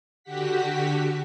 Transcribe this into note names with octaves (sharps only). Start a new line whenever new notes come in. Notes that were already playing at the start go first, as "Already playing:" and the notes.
D3 F#4 G4 F#5 B6